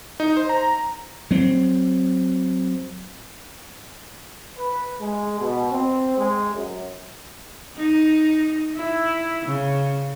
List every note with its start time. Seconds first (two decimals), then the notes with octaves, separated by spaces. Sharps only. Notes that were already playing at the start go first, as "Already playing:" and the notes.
0.20 D#4
0.37 C5
0.49 A#5
1.31 F#3 C4
4.58 B4
5.00 G#3
5.40 B2
5.72 C4
6.18 G#3
6.55 F#2
7.77 D#4
8.76 E4
9.46 C#3